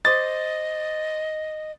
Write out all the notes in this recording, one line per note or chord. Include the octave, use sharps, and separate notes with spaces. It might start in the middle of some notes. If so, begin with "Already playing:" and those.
C5 D#5 D6 D#6 A6